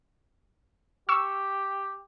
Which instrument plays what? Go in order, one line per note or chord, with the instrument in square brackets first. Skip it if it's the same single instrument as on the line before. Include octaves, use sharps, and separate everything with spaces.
[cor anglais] G4 [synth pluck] C#6 E6